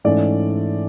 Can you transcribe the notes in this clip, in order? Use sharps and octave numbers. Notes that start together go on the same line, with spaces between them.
G#2 E3 A3 C#4 D5